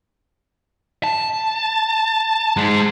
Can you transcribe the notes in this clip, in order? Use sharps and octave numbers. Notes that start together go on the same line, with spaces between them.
A5
G#2 G#3